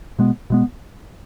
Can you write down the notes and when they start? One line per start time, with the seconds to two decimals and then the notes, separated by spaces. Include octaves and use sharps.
0.19 B2 G#3 B3
0.50 B2 G#3 B3